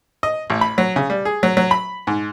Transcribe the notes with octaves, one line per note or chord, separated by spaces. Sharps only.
D#5
A1
B5
F#3
C#3
G3
G#4
F#3
F#3
B5
G#2